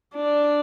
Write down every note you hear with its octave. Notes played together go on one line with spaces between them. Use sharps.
D4